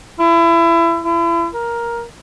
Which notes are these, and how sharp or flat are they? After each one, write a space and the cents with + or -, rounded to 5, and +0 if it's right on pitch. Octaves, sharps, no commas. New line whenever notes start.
E4 +30
E4 +35
A#4 +10